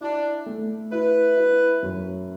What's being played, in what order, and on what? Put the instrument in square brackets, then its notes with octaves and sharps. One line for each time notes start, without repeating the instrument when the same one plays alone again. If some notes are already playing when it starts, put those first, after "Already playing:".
[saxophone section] D4 [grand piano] E4
[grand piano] A3
[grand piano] E4 [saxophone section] B4
[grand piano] E4
F#2